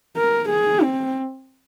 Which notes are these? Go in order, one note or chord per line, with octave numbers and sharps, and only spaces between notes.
A#4
G#4
C4